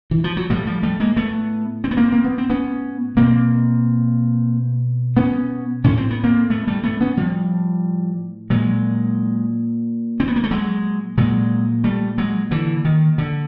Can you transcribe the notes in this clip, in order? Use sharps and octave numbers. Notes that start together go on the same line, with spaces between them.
E3
F3
F#3
A2 F3 G3
F3 G3
G3 A3
G#3 A#3
A3 B3
C4
B3
A#3 C4
A#3
B3
C4
B3 C#4
B2 A#3 C4
B3 C#4
A2 C#4
C4
B3
A#3 C4
A3 B3
G3 A3
A3 B3
B3 C#4
F3 G3
A#2 F#3 G#3
C4
B3
A#3
A3
F#3 G#3
A#2 F#3 G#3
G3 A3
F#3 G#3
D3 E3
D#3
D3